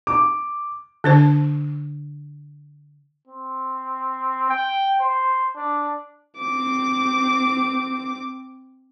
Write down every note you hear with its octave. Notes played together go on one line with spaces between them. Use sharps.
D6
D3 D4 C5
C4
G5
C5
D4
C4 D6